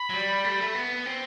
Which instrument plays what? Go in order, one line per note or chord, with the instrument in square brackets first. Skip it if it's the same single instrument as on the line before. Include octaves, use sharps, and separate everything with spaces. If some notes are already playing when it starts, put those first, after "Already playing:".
Already playing: [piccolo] B5
[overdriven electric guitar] F#3
G3
A3
G3
A3
B3
C4